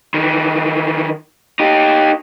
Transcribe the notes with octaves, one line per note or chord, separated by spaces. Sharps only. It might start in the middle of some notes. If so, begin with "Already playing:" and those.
D#3 E3
D#4 G4